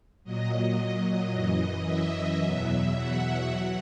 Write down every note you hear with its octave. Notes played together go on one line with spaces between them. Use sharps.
A#2 F#3 D#5
F#2 E3 D#5
E5
E2 B2 F#3
F#5
F#3